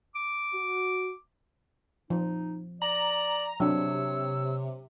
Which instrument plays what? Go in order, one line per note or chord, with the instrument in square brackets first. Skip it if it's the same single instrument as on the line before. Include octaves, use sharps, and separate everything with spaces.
[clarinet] D6
[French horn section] F#4
[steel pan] F3 [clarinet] D#4
[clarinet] D5 [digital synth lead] A#5 [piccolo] F#7
[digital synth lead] C3 [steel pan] F#3 D4 [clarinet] C#5 [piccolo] E6